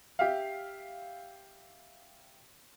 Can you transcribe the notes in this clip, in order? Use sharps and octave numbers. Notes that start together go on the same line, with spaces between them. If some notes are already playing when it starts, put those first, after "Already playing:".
G4 E5 F5